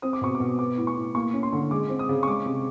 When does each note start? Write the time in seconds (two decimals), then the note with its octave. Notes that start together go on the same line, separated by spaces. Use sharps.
0.02 C4 D#6
0.13 D6
0.21 B2 C#6
0.35 D6
0.40 B2
0.59 B3 D6
0.77 A2
0.87 C#6
0.96 A2
1.15 A#3 C#6
1.34 C#4
1.43 C6
1.53 D3
1.71 G#3 D6
1.90 C4
1.99 D#6
2.09 C#3
2.23 C#6
2.27 G#3 D6
2.46 C3